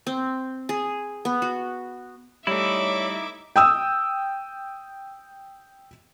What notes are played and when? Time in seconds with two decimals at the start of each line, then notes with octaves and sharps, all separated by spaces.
0.07 C4
0.69 G#4
1.25 B3
1.42 F#4
2.47 G3 A3 D#4 E4 C#5 E5 D6
3.56 G5 D#6 E6